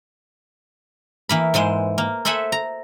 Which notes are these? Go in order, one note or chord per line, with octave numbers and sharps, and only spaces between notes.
E3 A#3 B5
G#2 E3 G#3 C5
A#3
A4 C5 E5 F#5 G#5 B5
A#5